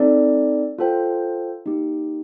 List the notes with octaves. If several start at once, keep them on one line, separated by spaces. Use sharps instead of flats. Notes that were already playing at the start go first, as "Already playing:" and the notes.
Already playing: C4 D#4 A4 D5
F4 A4 C5 G5
A#3 D#4 G4